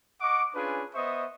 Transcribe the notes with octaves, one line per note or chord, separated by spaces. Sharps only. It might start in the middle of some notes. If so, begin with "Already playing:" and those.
D#5 F#5 C#6 D6
C#4 D4 F4 G#4 B4
B3 C5 D#5 E5 C#6 D#6